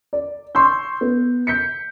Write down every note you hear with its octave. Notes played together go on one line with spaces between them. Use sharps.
D5
C6 C#6 E6 G6
B3
G6 B6 C#7